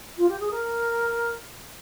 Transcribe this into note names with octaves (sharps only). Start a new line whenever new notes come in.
F4
G4
G#4
A#4